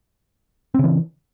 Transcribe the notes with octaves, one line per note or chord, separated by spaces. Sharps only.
C#3 E3 C4